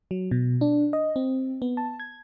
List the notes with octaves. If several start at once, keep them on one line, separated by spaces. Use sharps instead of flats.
F#3
B2
D4
D#5
C4
B3
A5
G#6